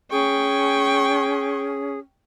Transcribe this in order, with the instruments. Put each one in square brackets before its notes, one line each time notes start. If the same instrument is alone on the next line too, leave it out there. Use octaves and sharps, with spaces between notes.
[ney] C#4 [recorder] G#4 [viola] G5 C#6